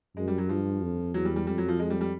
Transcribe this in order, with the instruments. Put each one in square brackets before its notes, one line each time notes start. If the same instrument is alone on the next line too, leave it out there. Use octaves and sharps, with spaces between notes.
[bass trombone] F#2 [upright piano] G#3
[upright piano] G3
F#3
[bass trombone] G2 [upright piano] F3
[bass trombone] F2
[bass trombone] E2 [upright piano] F#3
[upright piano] G3
G3
[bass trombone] F2 [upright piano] G3
[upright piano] F#3
F3
G#3
G3
G3